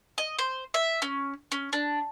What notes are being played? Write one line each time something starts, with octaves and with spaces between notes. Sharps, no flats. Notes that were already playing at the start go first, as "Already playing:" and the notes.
D#5
C5
E5
C#4
C#4
D4